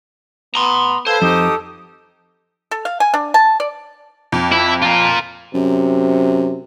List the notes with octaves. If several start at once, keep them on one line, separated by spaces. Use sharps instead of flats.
B3 A#5 C6
A4 B4 C5 F5 G#6
F2 D#4 G4 D#6
A4
F5
G#5
D4
A5
D5
F2
E4
F4 A#4
F#2 C3